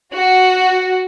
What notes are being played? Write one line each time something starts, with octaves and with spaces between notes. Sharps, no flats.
F#4